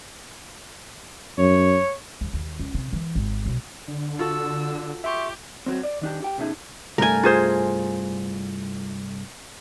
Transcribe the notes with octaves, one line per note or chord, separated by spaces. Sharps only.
F#2 C#5
D#2
D#2
C#2
C3
E3
G#1
B1
D3
F4 F#4 A4 E6
G4 E5 C6 C#6
F#3 C4
D5
D#3 D4 G4
G4 G5
B2 A3 C#4 D#4 G#4 E5
C2 G2 A3 A#4 G#5
F4 G#4 C5